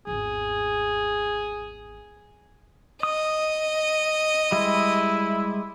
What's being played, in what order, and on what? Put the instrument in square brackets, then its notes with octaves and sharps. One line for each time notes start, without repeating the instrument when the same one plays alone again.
[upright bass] G#1 E2 [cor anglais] G#4
[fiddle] D#5 [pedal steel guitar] D#6
[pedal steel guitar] G3 G#3 [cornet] E4